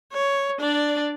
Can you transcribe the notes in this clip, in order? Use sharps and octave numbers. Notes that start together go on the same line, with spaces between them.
C#5
D4 D5